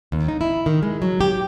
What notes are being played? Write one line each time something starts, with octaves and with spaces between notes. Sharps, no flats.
D#2
D#4
E4
D#3
G#3
F#3
G4